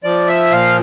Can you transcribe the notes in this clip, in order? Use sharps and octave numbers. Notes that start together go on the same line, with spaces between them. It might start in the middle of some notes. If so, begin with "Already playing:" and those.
F3 D5
E5
A#2 F5